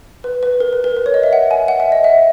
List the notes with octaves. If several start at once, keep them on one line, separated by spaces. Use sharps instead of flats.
B4
B4
A#4
B4
A#4
B4
C#5
D#5
E5
F#5
G#5
F#5
E5
D#5
E5